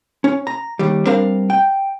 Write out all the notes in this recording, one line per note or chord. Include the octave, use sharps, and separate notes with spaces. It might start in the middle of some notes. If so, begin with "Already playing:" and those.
C#4
A#5
D#2 G3
G3 C4 D4 A#4 F5
G5